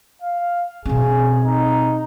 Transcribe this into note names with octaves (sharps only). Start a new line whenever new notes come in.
F5
B2 C4 G#4
D#4